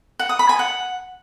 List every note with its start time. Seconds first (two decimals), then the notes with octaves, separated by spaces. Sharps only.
0.19 F#5
0.29 D#6
0.39 B5
0.49 G#5
0.59 F#5